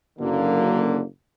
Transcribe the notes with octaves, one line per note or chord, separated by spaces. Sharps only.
F#1 F#2 D3 A#3